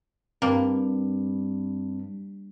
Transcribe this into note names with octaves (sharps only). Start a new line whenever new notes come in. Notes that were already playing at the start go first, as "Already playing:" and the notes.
G2 A#3 C4